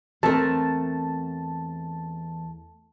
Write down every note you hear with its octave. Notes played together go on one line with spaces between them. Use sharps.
E2 A3 C4 A#4 A5